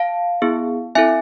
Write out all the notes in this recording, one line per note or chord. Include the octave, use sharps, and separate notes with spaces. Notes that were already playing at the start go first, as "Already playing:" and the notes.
Already playing: F5 A5
B3 E4 G#4
C4 E4 A4 E5 G#5